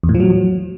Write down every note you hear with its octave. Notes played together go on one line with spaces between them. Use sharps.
E2
A2
F3
F#3